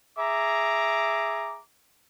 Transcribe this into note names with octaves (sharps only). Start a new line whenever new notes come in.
G#4 E5 A#5 D6